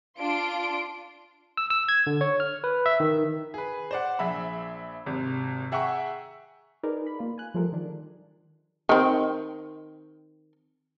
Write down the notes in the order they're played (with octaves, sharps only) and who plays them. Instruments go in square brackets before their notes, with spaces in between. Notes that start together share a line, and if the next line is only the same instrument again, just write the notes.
[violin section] D4 F4 C6 D7
[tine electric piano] E6
E6
G#6
D3
C#5
F6
B4
E5
D#3
[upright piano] G#4 B4
C5 D5 F#5
A#1 G#4 E5 B5
G#1 C3
G#4 E5 F#5 G5 A#5 C#6
[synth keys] D#4 G#4 A#4 B4 D5
B5
A#3 F4
G#5 F#6
F3 G3 A3 F4 G#4 A#4
D#3 D4
[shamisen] D#3 C4